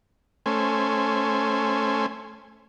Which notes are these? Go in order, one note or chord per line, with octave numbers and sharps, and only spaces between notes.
A3 C#4 C5 G#5